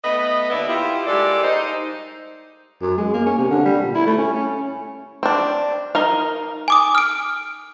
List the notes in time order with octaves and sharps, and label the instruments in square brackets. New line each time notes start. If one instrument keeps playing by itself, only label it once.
[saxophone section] A3 B3 B4 D#5
D#2 A#3 B3 E4 D5 E5
E4 F4 G4
G3 G#3 A#3 A4 D5
D#4 C5
[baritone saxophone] F#2
G#3
A#3
C#4
C3
D3
G3
A#2
E4
A3
C#4
C#4
[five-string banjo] C4 D4
D#4 A#4 F5
[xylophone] G#5 D6 D#6
F6 D7